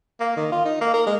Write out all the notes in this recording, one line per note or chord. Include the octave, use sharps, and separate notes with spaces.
A#3
D#3
F4
D#4
A#3
A#4
G#3